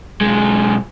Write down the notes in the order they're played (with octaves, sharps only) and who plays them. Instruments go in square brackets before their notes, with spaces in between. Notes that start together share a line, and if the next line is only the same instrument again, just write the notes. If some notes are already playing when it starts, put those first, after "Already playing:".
[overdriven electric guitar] B1 G#3